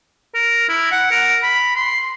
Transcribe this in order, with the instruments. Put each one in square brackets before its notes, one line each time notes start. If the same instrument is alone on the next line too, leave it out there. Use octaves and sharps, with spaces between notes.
[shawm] A#4
E4
F#5
A#4
B5
C6